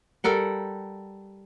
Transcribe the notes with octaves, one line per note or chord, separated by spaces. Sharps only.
G3 A4 A#4 F#5